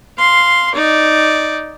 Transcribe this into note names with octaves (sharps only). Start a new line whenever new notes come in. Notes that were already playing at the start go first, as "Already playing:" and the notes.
F5 C6
D#4 D5